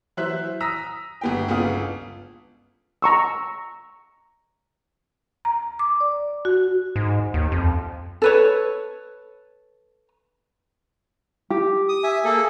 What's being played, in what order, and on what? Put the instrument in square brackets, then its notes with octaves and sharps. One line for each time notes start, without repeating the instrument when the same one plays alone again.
[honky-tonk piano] E3 F#3 C5 E5 F#6 B6
A#5 D#6 E6 A#6 B6
G1 B3 G5
G1 C#2 B3 F4 F5 D#6
[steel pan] A#5 C#6 E6
[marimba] A#5
D6
D5
F#4
[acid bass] G#2
D#2
F2
[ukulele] A4 B4 C#5
G4
[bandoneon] D#6
[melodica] E5 G#5
[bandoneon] A#3 A4 [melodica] G#4